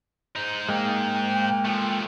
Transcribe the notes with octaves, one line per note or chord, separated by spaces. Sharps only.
G#2 D#4
G#3 A#3 G5
F3 A3